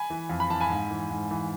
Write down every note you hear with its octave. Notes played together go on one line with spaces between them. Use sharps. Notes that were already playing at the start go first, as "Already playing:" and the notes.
Already playing: G#5 B5
E3
F2
B5
E3 A5
G#5 B5
G#2
E3
G#2
E3